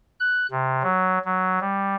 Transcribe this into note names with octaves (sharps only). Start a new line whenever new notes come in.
F#6
C3
F#3
F#3
G3